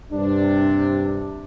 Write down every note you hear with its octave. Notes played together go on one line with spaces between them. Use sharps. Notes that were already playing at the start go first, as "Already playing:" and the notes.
G2 C3 D4